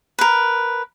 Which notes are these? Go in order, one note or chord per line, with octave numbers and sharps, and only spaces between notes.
A#4 B4